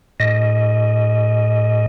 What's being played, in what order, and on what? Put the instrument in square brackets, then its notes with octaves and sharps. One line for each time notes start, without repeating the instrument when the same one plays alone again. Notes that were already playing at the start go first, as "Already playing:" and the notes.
[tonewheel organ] A2 D#5